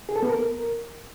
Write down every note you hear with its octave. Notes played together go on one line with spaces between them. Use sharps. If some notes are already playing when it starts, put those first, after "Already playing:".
G#4
A4
B3
A#4